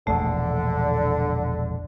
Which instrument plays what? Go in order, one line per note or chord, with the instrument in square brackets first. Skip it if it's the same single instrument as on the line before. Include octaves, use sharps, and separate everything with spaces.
[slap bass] E1 A#1 E2 [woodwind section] D3 [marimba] A3